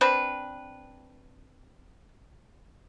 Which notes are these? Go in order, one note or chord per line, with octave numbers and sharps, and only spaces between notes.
C4 D4 B4